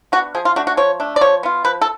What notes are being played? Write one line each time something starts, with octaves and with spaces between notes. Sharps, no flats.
B3 D4 F#4
F3 G#4
F4
A3 D4 F#4
F#4
F3 C#5
A3 D4
D5
F3 C#5
B3 F4
F3 B4
A4